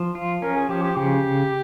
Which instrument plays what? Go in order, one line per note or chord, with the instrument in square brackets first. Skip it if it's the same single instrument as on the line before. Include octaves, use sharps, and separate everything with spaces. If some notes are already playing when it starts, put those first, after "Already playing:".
Already playing: [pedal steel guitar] F3
F4
[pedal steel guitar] C#4 [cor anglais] A#4
[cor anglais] G#4
[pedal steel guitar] F3 [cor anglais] G4
[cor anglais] G4
[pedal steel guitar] C#3 [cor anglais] G4